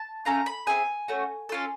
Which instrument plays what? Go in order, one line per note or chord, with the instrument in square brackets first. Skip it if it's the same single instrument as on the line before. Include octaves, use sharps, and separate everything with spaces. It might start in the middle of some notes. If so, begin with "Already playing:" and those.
Already playing: [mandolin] A5
A3 C#4 F4 A#5
B5
C4 E4 G#4 G#5
A3 C#4 F#4
C#4 F4 A4